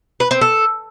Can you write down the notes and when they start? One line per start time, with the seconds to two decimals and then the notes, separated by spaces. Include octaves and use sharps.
0.20 B4
0.31 C4
0.41 A4